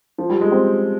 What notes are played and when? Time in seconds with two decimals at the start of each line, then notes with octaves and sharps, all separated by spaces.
0.18 F3
0.30 G3
0.41 G#3
0.52 C4